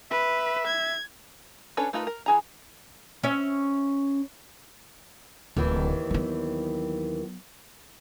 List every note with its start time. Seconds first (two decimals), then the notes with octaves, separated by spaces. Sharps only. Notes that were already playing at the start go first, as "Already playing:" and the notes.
0.11 B4 E5
0.67 G#6
1.77 C#4 D4 A4 B4 C#5
1.93 A3 D#4 F4 A#4 B4
2.07 A#4
2.26 E3 G#4 A#5
3.23 C#4 E5
5.57 D1 D#2 D#3 E3
6.11 F#3 B3